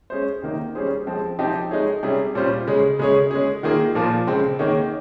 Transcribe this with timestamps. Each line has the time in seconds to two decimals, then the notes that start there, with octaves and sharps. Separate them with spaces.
0.10 G#3 C#4 G#4 C5
0.42 C3 D#3 A#3 D#4
0.75 G3 C#4 G#4 C5
1.07 F3 G#3 C4
1.38 C3 F3 C4 D#4 G4
1.71 G#3 D#4 G#4 C#5
2.03 C3 G3 C#4 G#4
2.35 A#2 G3 C#4 F4 C5
2.67 C#3 G#3 C#4 G#4
2.99 C#3 G#3 C#4 G#4 C#5
3.31 G#3 C#4 G#4
3.63 D#3 A#3 F4 G#4
3.95 A#2 F3 A#3 F4
4.27 C#3 G#3 C4
4.59 D#3 A#3 D#4 G#4 C#5